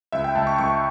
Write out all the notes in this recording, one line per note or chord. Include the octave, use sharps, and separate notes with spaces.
C#2 E5
G5
C#2 A5
C#6
C#2 C#6